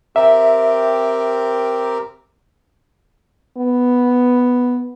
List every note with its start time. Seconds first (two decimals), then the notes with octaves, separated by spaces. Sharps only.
0.16 C4 G4 A#4 E5
3.57 B3